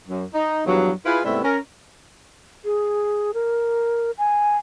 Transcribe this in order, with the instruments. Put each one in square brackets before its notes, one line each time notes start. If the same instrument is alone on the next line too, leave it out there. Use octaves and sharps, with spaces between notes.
[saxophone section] F#2
D#4
E2 G2 F3 F#3
E4 F4 G#4 B4
G#2 C3 G3 A3 B3 E4
C#4 A#4
[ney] G#4
A#4
G#5